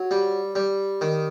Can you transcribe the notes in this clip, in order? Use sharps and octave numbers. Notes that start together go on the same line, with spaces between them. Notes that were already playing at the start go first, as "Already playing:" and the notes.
Already playing: F#3
G3
G3
D#3